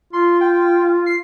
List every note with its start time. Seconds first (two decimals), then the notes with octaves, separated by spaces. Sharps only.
0.13 F4 C6
0.41 G5
1.06 C7